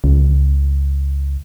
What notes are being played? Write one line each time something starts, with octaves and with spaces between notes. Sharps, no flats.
C#2